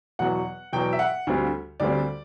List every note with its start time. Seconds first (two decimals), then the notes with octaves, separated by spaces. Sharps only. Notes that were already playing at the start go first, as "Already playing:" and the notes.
0.19 E2 B2 F#3 F#5
0.72 E2 B2 F#3 G5
0.93 E5
0.99 F#5
1.27 D2 D3 G3 C4
1.80 D2 D3 G3 C4 D5